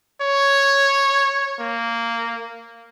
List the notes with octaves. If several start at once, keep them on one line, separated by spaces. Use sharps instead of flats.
C#5
A#3